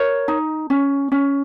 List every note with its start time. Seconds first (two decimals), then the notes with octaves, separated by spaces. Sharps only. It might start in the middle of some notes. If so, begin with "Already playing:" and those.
Already playing: A#4 C#5
0.28 D#4
0.70 C#4
1.12 C#4